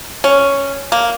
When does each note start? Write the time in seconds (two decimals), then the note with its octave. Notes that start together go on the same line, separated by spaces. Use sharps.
0.24 C#4
0.92 A#3